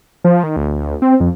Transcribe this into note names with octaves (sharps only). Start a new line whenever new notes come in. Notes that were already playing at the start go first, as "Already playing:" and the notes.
F3
D#3
D2
D2
C4
F2